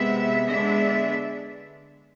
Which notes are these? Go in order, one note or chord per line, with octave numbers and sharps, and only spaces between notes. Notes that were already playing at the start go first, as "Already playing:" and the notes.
Already playing: C3 G#3 B3 E5
D3 G#3 B3 D4 E5